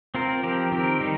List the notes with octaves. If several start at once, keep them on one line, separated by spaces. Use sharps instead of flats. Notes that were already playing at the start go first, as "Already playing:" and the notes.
C4 F4 A#4
F3 C4 G4 A#4
D#3 C4 G4 A#4
D#3 G3 D#4